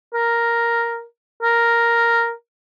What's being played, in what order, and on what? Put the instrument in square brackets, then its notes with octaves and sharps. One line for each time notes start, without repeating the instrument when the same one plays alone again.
[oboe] A#4
A#4